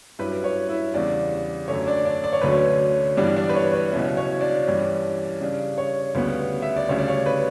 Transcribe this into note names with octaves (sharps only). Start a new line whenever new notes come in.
G2 F#3 C#4 E4 B4
C#5
E4 E5
E2 C#3 G3 D4 D5
F#2 D3 A3 C#5
D4 D5
D4 D5
D5
C#5
D2 D3 F#3 A3 C#4 B4
C#5
G2 E3 G3 B3 D4 D5
D4 D5
B4
C#5
C#5
C#2 B2 F#3 C#4 E4
C#5
D4 D5
G2 E3 G3 C#4
C#3 G3 D4
C#5
D2 C#3 G3 B3 B4
E5
D5
D2 C#3 G3 D4 C#5
D5
C#5
B4